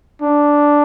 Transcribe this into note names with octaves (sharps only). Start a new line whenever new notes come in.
D4